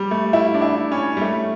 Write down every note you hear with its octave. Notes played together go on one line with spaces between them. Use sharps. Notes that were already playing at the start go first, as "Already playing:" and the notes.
Already playing: G3
A3
E4
D4
E4
C#4
G3
A3